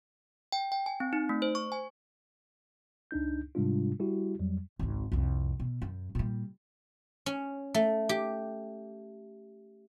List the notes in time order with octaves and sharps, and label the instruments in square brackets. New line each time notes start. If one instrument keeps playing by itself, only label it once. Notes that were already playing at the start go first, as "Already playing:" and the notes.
[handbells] G5
G5
G#5
C4
D#4
A3
C5
C#6
G#5
[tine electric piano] C#2 D4 D#4 G6
G#2 C3 G3 G#3 D4 F4
G3 E4 F#4 G4
F2 F#3 G3
[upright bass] G#1 C#2
C2 F2
B2
F#2
A#2 G3
[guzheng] C#4
A3
G4